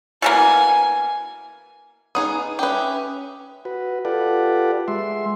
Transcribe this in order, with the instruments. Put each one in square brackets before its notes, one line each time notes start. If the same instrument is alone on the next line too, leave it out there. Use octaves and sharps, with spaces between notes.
[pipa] B2 E3 A#3 [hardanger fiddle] G#5
[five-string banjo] B3 D#4 G#4 [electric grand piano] D#6
[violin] C#4 E5 [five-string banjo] G4 B4
[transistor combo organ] F#4 B4
F4 G4 A4 B4 D5 F#5
G#3 E5 C6